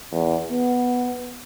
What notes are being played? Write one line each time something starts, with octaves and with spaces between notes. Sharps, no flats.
E2
B3